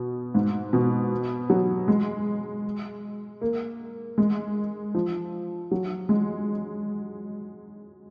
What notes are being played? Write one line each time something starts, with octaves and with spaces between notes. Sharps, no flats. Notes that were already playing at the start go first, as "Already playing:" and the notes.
Already playing: B2
G#2
B2
F#3
G#3
A#3
G#3
F3
F#3
G#3